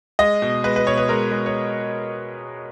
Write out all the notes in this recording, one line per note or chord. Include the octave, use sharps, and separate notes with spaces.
G#3 D#5
B2
G#3 B4
B4
B2 C#5
B4
G#3 A#4
G#3
C#5